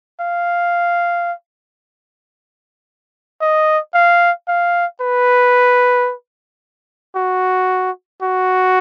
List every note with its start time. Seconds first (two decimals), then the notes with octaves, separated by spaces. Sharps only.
0.20 F5
3.41 D#5
3.94 F5
4.48 F5
5.01 B4
7.16 F#4
8.23 F#4